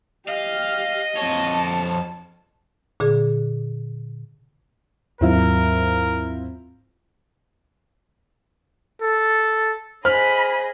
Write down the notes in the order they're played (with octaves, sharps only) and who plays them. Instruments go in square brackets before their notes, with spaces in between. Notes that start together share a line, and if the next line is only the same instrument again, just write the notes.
[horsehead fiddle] G4 [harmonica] D#5 [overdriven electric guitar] F5
[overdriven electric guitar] F2 C#5 [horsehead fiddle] A5
[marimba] A#2 D3 G#4
[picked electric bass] D#2 G#2 F#3 [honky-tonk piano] C4 E4 F4 [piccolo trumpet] A#4
[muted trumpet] A4
[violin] G#4 D#5 [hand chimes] C5 [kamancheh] B5 [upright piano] F6